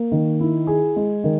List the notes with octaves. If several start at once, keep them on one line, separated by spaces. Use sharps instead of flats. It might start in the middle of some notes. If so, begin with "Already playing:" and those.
Already playing: A#3
D#3
E4
G#4
G#3
D#3